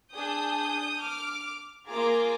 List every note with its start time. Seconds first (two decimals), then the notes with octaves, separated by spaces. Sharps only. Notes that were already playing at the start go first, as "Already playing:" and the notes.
0.14 D4 G#4 D#6 G6
1.00 D6 F6
1.87 A#3 F4 G#4 A#5 D6